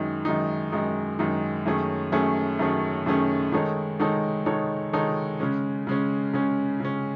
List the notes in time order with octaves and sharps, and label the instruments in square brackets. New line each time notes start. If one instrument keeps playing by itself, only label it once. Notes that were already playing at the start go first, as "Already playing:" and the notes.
Already playing: [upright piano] F#2 D#3 G#3 D#4
F#2 D#3 G#3 D#4
F#2 D#3 G#3 D#4
F#2 D#3 G#3 D#4
F#2 D#3 A3 C#4 G#4
F#2 D#3 A3 C#4 G#4
F#2 D#3 A3 C#4 G#4
F#2 D#3 A3 C#4 G#4
D#3 G#3 D#4 A4 C#5
D#3 G#3 D#4 A4 C#5
D#3 G#3 D#4 A4 C#5
D#3 G#3 D#4 A4 C#5
C#3 G#3 C#4
C#3 G#3 C#4
C#3 G#3 C#4
C#3 G#3 C#4